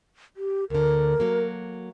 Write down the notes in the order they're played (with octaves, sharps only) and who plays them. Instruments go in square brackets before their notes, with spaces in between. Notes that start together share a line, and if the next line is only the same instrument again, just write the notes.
[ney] G4
[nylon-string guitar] D2 D3 [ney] A#4
[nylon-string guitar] F#3 A#3